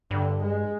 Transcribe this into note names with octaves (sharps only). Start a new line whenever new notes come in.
G2 D3
G#3